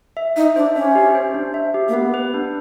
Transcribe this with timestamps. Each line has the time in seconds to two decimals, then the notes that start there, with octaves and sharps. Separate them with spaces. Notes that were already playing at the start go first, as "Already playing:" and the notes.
0.17 E5
0.36 D#4 E5
0.56 D4 C5
0.76 C#4 E5
0.95 G4
1.15 C5
1.34 D4
1.54 E5
1.74 G4
1.88 A#3
1.93 B3 G4
2.14 B4
2.34 D4